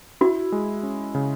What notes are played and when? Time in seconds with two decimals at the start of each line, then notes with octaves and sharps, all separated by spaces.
0.21 E4 F#4
0.52 G#3
0.83 C#4
1.15 C#3